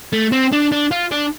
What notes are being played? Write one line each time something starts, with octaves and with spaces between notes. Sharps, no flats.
A3
C4
D4
D4
F4
D4